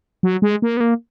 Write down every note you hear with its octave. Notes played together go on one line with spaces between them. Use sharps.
F#3
G#3
A#3
B3
A#3